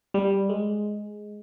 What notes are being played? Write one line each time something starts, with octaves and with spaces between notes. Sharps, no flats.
G3
G#3